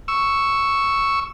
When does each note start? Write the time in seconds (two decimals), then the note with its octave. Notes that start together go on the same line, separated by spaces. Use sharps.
0.08 C#6 E6